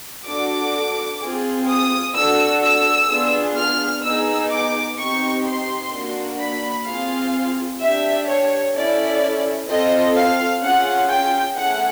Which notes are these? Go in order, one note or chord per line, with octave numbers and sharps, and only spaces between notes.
D4 F#4 A4 D6
C4 F4 G#4
D#6
D4 F#4 A4 E6
E6
B3 D4 F4 G#4
F6
B3 D#4 G#4 E6
D6
C4 D#4 G4 C#6
C6
A#3 D4 F#4
B5
C4 F4 G#4 F5
D4 G4 E5
C#5
C#4 E4 A4 D5
C4 F4 A4 D#5
F5
C#4 F4 G#4 F#5
G5
A3 C#4 E4 G#4 F#5